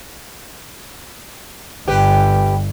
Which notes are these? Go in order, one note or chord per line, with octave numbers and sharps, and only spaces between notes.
G1 G4 B4